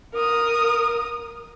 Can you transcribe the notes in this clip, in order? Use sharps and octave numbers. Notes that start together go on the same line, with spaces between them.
A#4 D#6